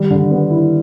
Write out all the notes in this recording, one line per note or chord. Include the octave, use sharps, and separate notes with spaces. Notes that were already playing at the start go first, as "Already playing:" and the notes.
Already playing: D#3 G3
D3
B3
E4